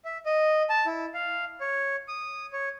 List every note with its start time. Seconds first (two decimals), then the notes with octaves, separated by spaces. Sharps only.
0.05 E5
0.26 D#5
0.70 A5
0.86 E4
1.14 F5
1.61 C#5
2.08 D#6
2.53 C#5